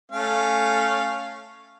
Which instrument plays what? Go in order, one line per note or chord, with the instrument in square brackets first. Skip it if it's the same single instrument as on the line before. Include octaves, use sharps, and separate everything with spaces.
[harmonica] A3 C#4 F5